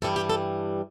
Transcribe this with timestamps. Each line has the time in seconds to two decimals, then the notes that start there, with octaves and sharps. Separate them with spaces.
0.02 G2 E3 G3 A4
0.16 G4
0.30 A4